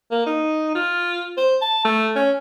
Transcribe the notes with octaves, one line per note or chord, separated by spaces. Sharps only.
A#3
D#4
F4
C5
A5
A3
C#4